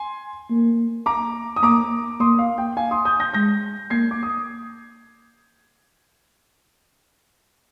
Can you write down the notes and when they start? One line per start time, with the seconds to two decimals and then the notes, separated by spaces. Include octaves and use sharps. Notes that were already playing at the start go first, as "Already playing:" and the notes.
Already playing: G#5 C6
0.50 A#3
1.06 A#5 D6
1.56 D#6
1.63 A#3 A#5 D6
2.20 A#3 C6 D#6
2.39 F5
2.58 G5
2.77 F5 G#5
2.91 C6 D#6
3.05 D#6 G6
3.20 G6 A#6
3.34 G#3 G6 A#6
3.90 A#3 G#6 C7
4.11 D6
4.23 D#6